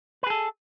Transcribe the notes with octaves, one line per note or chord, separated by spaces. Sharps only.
G#4 A4 B4